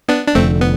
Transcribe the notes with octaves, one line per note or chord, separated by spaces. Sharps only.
B3 D4
D4
F1 F2 D3 A3 C4
B3